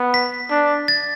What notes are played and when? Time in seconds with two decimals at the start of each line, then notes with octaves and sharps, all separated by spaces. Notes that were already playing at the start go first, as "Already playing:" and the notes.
Already playing: B3
0.14 B6
0.51 D4
0.88 A6